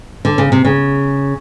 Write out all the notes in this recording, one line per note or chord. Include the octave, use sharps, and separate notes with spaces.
D3
C#3
C3
C#3